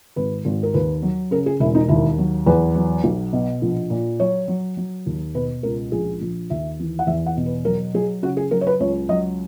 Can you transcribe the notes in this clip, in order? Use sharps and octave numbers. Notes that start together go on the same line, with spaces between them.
G#1 B4
G#1
A#4
D#2 B4
F#3
C#3 A#4
G#4
E1 E4
D#4
D#2 E4
F#3
E2 B4
F#3
B1
B2
A#1
A#2
F#3 C#5
F#3
F#3
D#2
B2 B4
C#2 A#4
A#1 G#4
A#1
D#2 E5
E3
F#5
E2 E5
F#5
B2
B4
F#3 A#4
F#3 G#4
C#3 F#4
G#4
F#3 A#4
C#5
B4
C#2 C#5
F#3 D#5